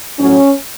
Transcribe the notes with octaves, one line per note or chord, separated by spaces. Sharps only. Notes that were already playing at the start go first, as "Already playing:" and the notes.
A2 F#3 C#4